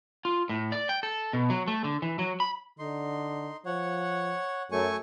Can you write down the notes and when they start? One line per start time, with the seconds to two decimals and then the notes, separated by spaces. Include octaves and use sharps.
0.25 F4
0.49 A2
0.72 D5
0.89 G5
1.03 A4
1.33 B2
1.50 F#3
1.68 A3
1.84 D3
2.02 E3
2.19 F#3
2.40 B5
2.79 D3 D#4 C6
3.66 F3 C#5 F#5
4.72 F#2 A3 G#5 C#6